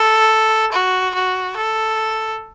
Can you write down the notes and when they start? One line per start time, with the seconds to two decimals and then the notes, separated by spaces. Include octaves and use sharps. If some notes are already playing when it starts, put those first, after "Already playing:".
Already playing: A4
0.73 F#4
1.15 F#4
1.57 A4